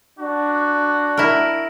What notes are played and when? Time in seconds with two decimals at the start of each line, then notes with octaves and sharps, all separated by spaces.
0.19 D4 F#4
1.17 E4 A#4